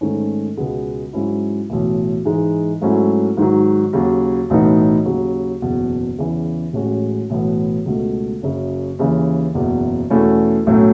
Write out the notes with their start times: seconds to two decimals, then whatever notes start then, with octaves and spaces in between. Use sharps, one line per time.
0.01 G#2 D#3 A3 C#4
0.57 C#2 B2 G#3 B3
1.13 G#2 F#3 C#4 E4
1.70 B1 A2 E3
2.25 G#2 E3 G#3 D#4
2.81 G#2 F#3 A3 C#4 E4
3.37 G#2 D#3 F#3
3.93 D#2 C#3 F#3
4.50 B1 A2 E3 B3 D#4
5.05 D#2 C#3 F#3
5.62 F#1 E2 B2
6.18 E2 C#3 E3
6.73 A1 A2 G#3 C#4 F#4
7.30 B1 A2 E3 B3
7.85 C#2 B2 A3
8.42 F#1 F#2 C#3
8.99 D#2 C#3 E3
9.54 F#1 E2 B2
10.10 E2 B2 A3 C#4 E4
10.66 B1 A2 F#3 A3 C#4